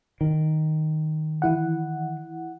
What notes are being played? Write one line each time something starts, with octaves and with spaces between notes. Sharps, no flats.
D#3
E3 E4 F#5